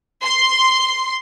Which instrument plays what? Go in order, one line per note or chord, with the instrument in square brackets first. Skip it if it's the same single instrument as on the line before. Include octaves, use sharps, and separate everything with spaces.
[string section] C6